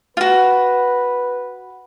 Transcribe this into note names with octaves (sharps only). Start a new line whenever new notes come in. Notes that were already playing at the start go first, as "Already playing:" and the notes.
F4 F#4 B4